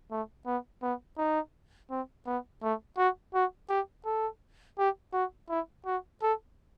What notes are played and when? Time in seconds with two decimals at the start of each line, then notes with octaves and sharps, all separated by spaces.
0.11 A3
0.46 B3
0.82 B3
1.18 D#4
1.90 C4
2.27 B3
2.63 A3
2.97 F#4
3.34 F#4
3.69 G4
4.05 A4
4.78 G4
5.13 F#4
5.49 E4
5.86 F#4
6.22 A4